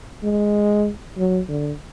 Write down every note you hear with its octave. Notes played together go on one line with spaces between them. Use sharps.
G#3
F#3
D3